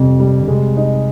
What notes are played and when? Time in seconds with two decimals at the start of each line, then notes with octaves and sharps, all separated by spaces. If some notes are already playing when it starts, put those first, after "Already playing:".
Already playing: F2 C3 G3
0.20 G3
0.42 D3
0.48 C3 G#3
0.77 D#4